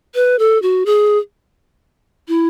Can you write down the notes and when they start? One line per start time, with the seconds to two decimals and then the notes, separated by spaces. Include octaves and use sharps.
0.15 B4
0.39 A4
0.62 F#4
0.86 G#4
2.28 E4